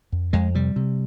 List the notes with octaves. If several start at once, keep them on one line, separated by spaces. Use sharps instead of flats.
F2
F2 G#3
C3 G3
C3